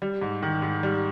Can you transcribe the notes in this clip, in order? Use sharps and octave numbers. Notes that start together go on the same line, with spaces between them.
G3
G#2
D#3
G#2
G3